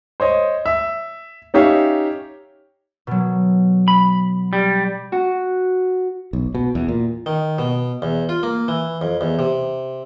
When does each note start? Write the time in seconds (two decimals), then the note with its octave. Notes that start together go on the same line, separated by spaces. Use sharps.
0.20 C5 C#5 D#5
0.66 E5
1.54 C#4 D#4 G4 C#5 E5 F5
3.07 B2 F#3
3.88 B5
4.53 G3
5.12 F#4
6.33 B1
6.55 B2
6.75 E2
6.88 A#2
7.26 D#3
7.59 B2
8.02 E2
8.29 F4
8.43 A#3
8.68 E3
9.02 F2
9.21 E2
9.39 C3